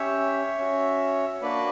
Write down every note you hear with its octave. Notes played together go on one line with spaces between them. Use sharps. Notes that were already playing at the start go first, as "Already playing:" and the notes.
Already playing: C#4 G4 C#5 E5
C#4 F#4
A#3 D4 F#4 B4 D5